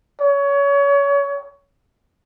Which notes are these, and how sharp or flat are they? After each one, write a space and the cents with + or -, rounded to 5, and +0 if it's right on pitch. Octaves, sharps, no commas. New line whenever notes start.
C#5 +25